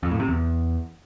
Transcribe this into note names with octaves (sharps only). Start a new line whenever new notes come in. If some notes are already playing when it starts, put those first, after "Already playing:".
F2
A2
C3
E2